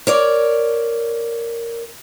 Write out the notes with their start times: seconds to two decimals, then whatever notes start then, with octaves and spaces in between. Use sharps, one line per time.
0.07 A#4 C#5 D5